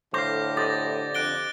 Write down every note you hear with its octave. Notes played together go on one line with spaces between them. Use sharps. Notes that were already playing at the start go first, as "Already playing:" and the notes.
A2 D3 C5 F5 D6 G6 A#6
G4 C5 D#5 A6
F2 F#6 D7 G7